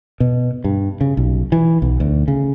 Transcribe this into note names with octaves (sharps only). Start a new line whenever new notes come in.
B2
G2
C#3
B1
E3
B1
D2
C#3